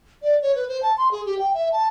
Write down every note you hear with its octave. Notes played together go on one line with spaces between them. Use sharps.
D5
C#5
B4
C5
A5
C6
G#4
G4
G5
E5
A5